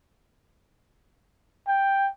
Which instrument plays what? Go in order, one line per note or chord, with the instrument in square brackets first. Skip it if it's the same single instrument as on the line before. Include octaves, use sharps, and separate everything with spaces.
[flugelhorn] G5